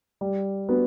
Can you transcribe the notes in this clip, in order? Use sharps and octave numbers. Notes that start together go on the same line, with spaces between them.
G3
B3 D4 F#4